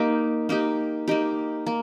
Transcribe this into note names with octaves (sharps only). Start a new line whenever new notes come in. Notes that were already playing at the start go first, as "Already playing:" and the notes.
Already playing: A#3 D#4 G4
A#3 D#4 G4
A#3 D#4 G4
A#3